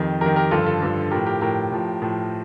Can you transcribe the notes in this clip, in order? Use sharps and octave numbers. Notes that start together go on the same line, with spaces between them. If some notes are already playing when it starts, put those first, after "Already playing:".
Already playing: F2 D#3 G4
F2 D#3 G4 A#4
G4 A#4
G2 D3 F3 F4 A4
F4 A4
G2 D3 F3
A2 F3 G4 A#4
G4 A#4
A2 F3 G4 A#4
A2 F3
A2 F3